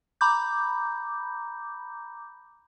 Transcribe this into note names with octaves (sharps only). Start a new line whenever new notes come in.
A#5 B5 D6 G6